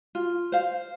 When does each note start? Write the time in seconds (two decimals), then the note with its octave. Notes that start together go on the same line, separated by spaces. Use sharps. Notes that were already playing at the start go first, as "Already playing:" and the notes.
0.15 F4
0.52 C5 F5